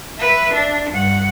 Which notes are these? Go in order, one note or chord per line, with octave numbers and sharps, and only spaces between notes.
B4 E5
D4
G2 F#5